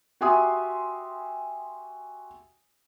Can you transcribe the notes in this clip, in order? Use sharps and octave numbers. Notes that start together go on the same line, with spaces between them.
F#4 G4 E5 G#5 C6 D#6